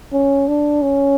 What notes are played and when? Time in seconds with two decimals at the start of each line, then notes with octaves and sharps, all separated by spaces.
0.13 C#4
0.48 D4
0.82 C#4